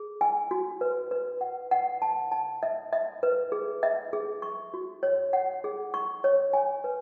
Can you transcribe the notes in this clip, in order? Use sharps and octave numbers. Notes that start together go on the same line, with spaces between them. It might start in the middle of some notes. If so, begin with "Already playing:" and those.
Already playing: G#4
G#5
F#4
B4
B4
F#5
F#5
A5
A5
E5
E5
B4
G#4
E5
G#4
C#6
F#4
C#5
F#5
G#4
C#6
C#5
G#5
B4